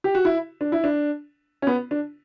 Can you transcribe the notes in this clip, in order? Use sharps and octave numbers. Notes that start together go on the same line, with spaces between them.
G4
F#4
E4
D4
E4
D4
C#4
B3
D4